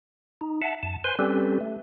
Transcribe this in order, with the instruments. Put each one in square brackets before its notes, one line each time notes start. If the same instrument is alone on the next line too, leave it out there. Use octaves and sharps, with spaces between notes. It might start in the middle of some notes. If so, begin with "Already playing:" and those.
[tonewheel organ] D#4
E5 F#5 A5
F#2 A5
B4 C5 G#5 C6
G3 C4 C#4 G4 A4 B4
A3